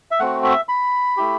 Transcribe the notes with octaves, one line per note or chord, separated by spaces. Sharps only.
E5
A3 C4 F#4 F#5
E5
B5
A3 E4 G4